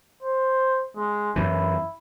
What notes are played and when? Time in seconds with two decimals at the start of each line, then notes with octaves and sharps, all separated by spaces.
0.22 C5
0.96 G#3
1.36 F#2 E3 E4